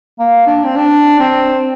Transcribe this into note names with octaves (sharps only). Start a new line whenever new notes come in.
A#3
D4
C4
D4
C4